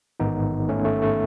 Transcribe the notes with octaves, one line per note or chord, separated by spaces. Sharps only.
A1 G#2 D#3 B3 D#4
A3 C#4
A3
A3